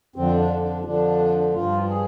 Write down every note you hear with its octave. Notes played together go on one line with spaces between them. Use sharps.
F2 D3 F3 C4
D4
D4
F2 D3 F3 D4
G2 F3 F4
G#4